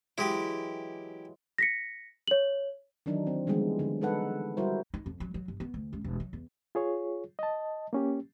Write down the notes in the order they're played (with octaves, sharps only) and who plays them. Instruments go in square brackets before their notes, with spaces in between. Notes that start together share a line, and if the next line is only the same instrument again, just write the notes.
[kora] E3 F#3 G#3 [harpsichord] E4 G4
[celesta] A#6 B6 C#7
C#5 F#7
[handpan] D#3 E3 F#3 D4 D#4
C4
D3 E3 F3 G3 G#3 B3
D3
G#3 D#4 A4 B4 F#5
G3 E4 F#4 A#4 C5
[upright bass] D#4
F2
F#3
F#3
G1
B3
D2
C#2
E1
F#3
E2
[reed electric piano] F4 G#4 C#5
D#5 A5
A#3 C#4 G4